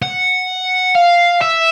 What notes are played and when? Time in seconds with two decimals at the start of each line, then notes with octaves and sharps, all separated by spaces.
0.02 F#5
0.95 F5
1.41 E5